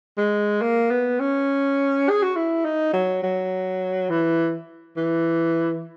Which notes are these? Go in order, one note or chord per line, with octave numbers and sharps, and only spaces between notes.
G#3
A#3
B3
C#4
G#4
F#4
E4
D#4
F#3
F#3
E3
E3